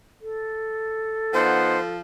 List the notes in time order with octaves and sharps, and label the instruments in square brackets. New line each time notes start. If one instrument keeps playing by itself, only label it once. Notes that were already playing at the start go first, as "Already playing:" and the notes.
[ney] A4
[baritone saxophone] F3 [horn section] B3 D#4 F#5 [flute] C5